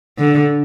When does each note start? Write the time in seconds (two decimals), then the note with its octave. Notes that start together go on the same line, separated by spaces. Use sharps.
0.18 D3